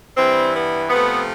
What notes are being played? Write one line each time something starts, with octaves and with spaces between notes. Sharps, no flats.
G2 E3 G3 C4
B3
C3 F3 A3 B3